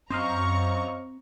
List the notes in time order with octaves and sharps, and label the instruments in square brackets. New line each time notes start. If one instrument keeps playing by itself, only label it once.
[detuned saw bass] F#2 [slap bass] C4 [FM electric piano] C5 D#5 F5 [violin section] A#5 C#6